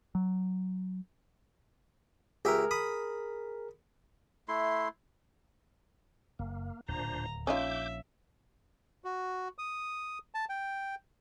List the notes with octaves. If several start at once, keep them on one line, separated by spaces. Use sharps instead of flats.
F#3
C#2 G4 G#4 A#4 E5
B5 D#6
A3 E4 C6
F#1 A#3
D1 D#2 A#2 D4 C5 A#5
A#1 C#4 D#4 F4 E5 D6 G6
F#4
D#6
A5
G5